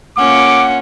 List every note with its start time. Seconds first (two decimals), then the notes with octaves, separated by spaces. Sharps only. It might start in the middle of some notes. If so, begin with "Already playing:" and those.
0.17 A#3 C#4 F4 F#5 D6